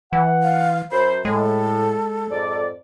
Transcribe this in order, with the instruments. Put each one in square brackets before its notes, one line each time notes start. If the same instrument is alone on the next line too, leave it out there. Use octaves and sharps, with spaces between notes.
[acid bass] E3 [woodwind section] F#5
[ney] F5
[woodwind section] F#2 C5 [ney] B5
[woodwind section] A2 [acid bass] G#3 [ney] A4
[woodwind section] F2 G#2 D5